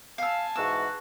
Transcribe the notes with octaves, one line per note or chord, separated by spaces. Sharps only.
F5 G#5 A5 E6
G#2 E3 F#4 E6